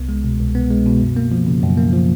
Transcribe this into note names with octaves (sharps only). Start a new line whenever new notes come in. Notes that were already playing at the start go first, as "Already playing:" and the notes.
Already playing: C2 B3
G#3
B2
C2
B3
G#3
B2
F#2
A#3
F3
C#3
F#2
A#3
F3